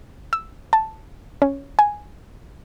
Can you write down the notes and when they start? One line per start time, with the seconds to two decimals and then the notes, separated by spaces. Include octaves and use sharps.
0.33 E6
0.73 A5
1.42 C#4
1.79 G#5